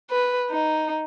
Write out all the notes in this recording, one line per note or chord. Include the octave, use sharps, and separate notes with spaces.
B4
D#4